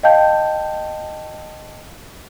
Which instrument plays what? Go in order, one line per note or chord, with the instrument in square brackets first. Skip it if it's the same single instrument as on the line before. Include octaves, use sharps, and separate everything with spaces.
[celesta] D#5 F5 G5 A5 G6